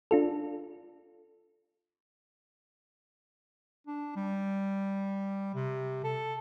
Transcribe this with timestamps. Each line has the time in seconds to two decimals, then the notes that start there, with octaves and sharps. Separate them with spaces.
0.11 D4 F4 A4
3.87 D4
4.16 G3
5.55 C3
6.04 A4